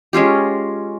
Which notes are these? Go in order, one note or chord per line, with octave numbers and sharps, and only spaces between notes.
G#3 C#4 F4 G4